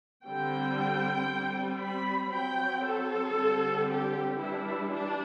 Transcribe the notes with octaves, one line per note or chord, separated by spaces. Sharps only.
D3 G3 C4 G5
G3 C4
B5
F#3 C4 G5
A4
D3 G3 C4
G4
E3 G3 D4 E4
D4